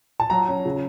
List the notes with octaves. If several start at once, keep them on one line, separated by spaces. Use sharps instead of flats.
A5
F#3 A#5
C#4
C#3